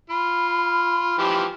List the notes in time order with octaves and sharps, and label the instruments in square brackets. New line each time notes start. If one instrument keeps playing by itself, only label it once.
[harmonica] F4 [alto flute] B5
[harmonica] E3 F3 G4